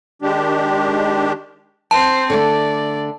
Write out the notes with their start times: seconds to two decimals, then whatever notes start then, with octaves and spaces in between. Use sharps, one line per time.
0.22 D#3 G#3 D4 G4
1.91 C4 C5 A5
2.30 D3 A3 D5